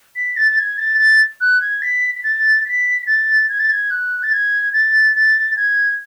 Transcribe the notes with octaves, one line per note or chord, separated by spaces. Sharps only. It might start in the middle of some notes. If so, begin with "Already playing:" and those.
B6
A6
A6
G#6
A6
A6
F#6
G#6
B6
B6
A6
B6
A6
G#6
A6
G#6
F#6
A6
G#6
A6
A6
G#6